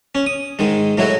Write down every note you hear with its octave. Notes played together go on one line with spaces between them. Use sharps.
C#4
D#6
G#2 D#3 G#3
A2 F#3 G#3 E4 F#4